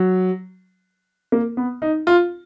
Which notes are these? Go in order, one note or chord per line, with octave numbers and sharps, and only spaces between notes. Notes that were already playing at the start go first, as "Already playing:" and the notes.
Already playing: F#3
A#3
B3
D#4
F4